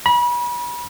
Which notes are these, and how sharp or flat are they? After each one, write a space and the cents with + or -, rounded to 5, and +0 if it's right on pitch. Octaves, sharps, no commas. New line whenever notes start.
B5 -35